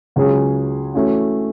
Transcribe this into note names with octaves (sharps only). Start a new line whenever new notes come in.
C#2 C#3 F#3 C#4 G#4
E3 A3 C#4 F#4